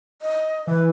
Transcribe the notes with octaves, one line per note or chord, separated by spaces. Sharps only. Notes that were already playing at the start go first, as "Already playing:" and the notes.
D#5
E3 B4